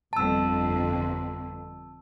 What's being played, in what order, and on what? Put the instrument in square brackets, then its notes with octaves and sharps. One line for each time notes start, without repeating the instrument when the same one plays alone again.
[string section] G1 F2 [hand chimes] A5 E6